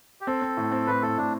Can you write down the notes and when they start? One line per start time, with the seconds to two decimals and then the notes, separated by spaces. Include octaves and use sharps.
0.21 G4
0.27 C4 A4
0.42 C4
0.57 A2
0.72 C4
0.87 A2 B4
1.02 A2 A4
1.18 A2 D4